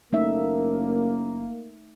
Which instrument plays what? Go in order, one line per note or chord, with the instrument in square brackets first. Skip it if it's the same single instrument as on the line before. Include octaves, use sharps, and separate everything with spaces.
[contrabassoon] F#1 [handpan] A3 D#4 E5 [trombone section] A#3